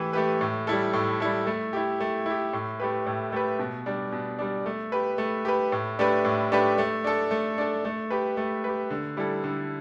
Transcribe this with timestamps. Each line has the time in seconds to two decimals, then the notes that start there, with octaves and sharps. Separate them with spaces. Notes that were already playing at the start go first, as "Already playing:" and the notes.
Already playing: E3 A3 G4 B4
0.13 A3 G4 B4
0.41 A2
0.67 G3 E4 A4
0.93 A2
1.20 G3 E4 A4
1.47 A3
1.73 E4 G4
2.00 A3
2.26 E4 G4
2.53 A2
2.80 A3 G4 B4
3.06 A2
3.32 A3 G4 B4
3.59 B2
3.86 G3 D4
4.12 B2
4.39 G3 D4
4.66 A3
4.92 G4 B4
5.18 A3
5.45 G4 B4
5.72 A2
5.99 A3 D4 G4 B4
6.25 A2
6.52 A3 D4 G4 B4
6.78 A3
7.04 D4 A4
7.31 A3
7.58 D4 A4
7.85 A3
8.10 G4 B4
8.37 A3
8.64 G4 B4
8.90 D3
9.17 G3 E4 A4
9.44 D3